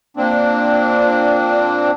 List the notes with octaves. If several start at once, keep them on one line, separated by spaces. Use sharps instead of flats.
A#2 A#3 C4 D4